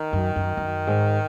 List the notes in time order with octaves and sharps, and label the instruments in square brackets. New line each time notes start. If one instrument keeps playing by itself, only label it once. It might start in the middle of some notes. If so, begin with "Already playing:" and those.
Already playing: [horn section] D#3
[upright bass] F#2
F#2
F#2
G#2